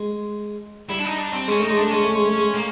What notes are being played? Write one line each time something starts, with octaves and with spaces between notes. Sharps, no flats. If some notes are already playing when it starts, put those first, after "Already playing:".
Already playing: G#3
G3 E4
D4
D#4
D4
C4
G#3 C#4
A3 D#4
G#3
A3 D4
G#3 C#4
A3
G#3
A3
G#3
A#3